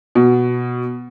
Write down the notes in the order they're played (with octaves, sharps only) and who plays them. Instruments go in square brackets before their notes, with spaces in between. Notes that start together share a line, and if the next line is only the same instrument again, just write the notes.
[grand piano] B2